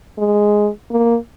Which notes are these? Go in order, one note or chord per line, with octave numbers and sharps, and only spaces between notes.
G#3
A#3